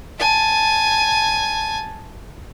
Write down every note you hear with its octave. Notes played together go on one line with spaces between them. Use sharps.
G#5 A5